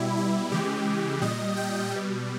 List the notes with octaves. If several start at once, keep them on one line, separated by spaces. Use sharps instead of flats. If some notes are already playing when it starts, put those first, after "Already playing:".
Already playing: B2 G3 E4
E4
C#3 E3 G#3 G4
A#2 G3 D#5
G5
B2 G3